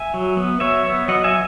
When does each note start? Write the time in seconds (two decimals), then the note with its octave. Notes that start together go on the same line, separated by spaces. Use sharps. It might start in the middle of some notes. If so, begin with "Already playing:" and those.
Already playing: E5 G#5
0.14 F#3
0.37 B3
0.60 F#3 C#5 E5
0.85 B3
1.08 F#3 D#5 F#5
1.24 E5 G#5